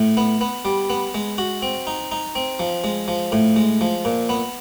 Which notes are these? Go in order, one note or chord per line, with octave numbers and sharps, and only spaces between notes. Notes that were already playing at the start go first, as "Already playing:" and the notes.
Already playing: A2
B3
B3
G3
B3
G#3
F#4
C4
D#4
D#4
C4
F3
G#3
F3
A2
G#3
F3
A#2
B3